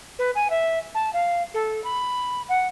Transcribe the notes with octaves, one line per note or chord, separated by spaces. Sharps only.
B4
G#5
E5
A5
F5
A4
B5
F#5